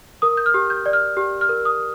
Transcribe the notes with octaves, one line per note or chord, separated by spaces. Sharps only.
A#4 D#6
G6
F6
G4
G6
D5
F6
G4
F6
A#4
D#6